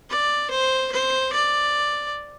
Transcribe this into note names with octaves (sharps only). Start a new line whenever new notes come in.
D5
C5
C5
D5